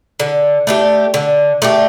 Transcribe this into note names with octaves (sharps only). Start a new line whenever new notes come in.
D3
A3 D4 G4
D3
A3 D4 G4